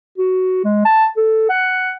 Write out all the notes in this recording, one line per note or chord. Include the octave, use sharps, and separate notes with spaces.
F#4
G#3
A5
A4
F#5